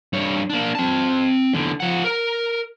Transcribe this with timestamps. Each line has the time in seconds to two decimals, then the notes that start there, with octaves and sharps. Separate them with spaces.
0.13 G2 C#5
0.50 A#3 D4
0.75 C4 A5
1.53 E2 D3
1.80 F3 F#5
2.04 A#4